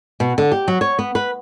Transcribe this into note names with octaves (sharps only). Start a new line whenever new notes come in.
B2
D3
G4
F#3
C#5
B3
B4